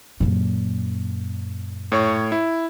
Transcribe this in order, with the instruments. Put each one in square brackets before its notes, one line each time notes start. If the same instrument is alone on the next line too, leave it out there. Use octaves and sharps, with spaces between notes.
[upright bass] F#2 A#2
[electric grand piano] A2 C#5 C#6
E4